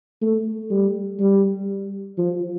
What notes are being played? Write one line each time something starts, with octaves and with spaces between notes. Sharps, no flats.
A3
G3
G3
F3